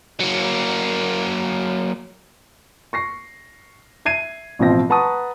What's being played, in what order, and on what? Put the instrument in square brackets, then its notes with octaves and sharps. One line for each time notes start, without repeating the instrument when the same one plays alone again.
[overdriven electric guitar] F#3 A#3
[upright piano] C#6 A#6 C7
E5 G#6 C7 D#7
A1 B2 F3 C4 F4 A#6
B4 F#5 A5 A#5 C#6 D#6